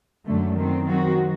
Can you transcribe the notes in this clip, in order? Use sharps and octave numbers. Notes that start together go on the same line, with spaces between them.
F#2 D3 F#3 A3
D#3 F#3 C4
D#3 F#3 C4 F#4